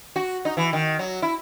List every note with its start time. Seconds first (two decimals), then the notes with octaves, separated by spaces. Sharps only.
0.16 F#4
0.45 D#4
0.57 E3
0.73 D#3
0.99 F#3
1.22 E4